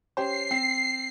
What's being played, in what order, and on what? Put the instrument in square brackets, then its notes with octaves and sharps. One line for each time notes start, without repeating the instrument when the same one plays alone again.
[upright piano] C#4 G4 C5 [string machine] C7
[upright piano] C4